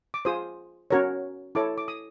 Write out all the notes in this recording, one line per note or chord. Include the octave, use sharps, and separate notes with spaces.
D6
F4 G#4 C5 D#6
C#4 F#4 A#4 C#5
E4 A4 C#5 D6
D6
D#6